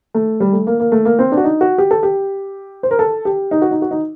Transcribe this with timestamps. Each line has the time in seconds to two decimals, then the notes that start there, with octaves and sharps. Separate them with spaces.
0.14 A3
0.40 G3
0.53 A3
0.67 A#3
0.80 A#3
0.92 A3
1.05 A#3
1.19 C4
1.32 D4
1.37 F#4
1.44 D#4
1.61 F#4
1.78 G4
1.91 A4
2.03 G4
2.83 C5
2.91 A#4
2.99 A4
3.25 G4
3.51 D#4
3.62 F#4
3.71 D#4
3.82 F#4
3.91 D#4